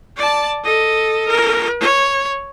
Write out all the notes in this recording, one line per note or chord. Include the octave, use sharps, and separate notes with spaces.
D5 A5
A4 D#5
A#4
C#5